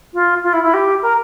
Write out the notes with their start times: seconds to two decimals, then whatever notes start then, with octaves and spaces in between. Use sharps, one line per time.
0.14 F4
0.43 F4
0.53 E4
0.63 E4
0.74 G4
1.02 A#4